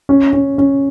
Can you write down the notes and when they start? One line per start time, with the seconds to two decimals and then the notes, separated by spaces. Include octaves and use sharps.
0.09 C#4
0.33 C#4
0.58 C#4